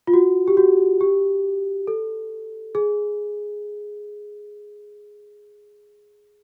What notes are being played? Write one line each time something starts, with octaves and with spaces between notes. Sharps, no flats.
F4
F#4
G4
F#4
G4
A4
G#4